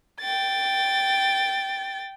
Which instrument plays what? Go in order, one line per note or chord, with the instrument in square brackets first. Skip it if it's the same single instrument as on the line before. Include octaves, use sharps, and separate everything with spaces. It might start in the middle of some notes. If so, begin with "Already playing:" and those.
[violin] G5 A6